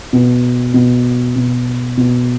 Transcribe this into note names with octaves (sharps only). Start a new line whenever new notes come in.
B2
B2
B2
B2